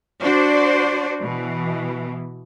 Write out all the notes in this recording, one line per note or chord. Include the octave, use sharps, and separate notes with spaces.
D4 F#4 C5 D5
B2 E3